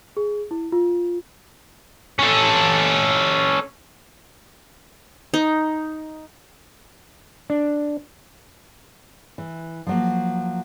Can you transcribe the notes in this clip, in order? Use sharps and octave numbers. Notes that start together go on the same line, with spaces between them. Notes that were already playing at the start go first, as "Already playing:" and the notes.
G#4
E4
F4
C#4 A4
D#4
D4
E3
F3 F#3 A#3